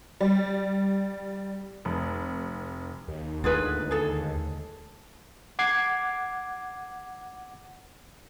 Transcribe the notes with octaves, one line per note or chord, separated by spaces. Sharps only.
G3
F1
D#2
D2 G#2 D3 F4 G#4 B4
G#4 A4
F#5 D6 G#6 C7